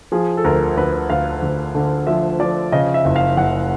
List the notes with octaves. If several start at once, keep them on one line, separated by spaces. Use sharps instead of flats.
F3 G#4
A4
D2 A#4
D2 B4
D2 F5
D2
D3
F3 E5
F3 D5
C#3 D#5
E5
F#1
F5
F#1 F#5